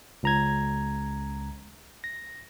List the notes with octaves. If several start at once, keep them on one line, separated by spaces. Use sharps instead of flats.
C#2 A#5 G#6
A#6